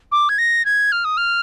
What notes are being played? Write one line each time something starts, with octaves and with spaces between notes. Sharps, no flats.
D6
G#6
A#6
G#6
F6
D#6
F6